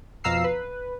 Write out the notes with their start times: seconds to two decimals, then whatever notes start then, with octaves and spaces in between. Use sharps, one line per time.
0.24 F2 B2 F5 A#5 E6 C7
0.44 B4